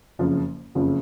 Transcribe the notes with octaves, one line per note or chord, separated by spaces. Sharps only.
F#1 F2 C#3 F3
F#1 F2 C#3 F3